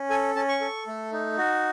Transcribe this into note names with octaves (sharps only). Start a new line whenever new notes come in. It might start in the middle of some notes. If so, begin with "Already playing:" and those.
Already playing: C#4
A4 G#5
C#4 A5
C#6
A4
A3
D#4
F#4